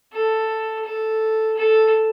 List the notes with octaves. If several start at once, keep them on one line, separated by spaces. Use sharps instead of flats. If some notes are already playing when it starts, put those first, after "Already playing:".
A4
A4
A4